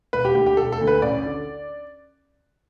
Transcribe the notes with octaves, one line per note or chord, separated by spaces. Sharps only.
E1 B4
G4
D2 D3 G4
G4
E1 A4
A4
D2 D3
B4
A1 D5
D3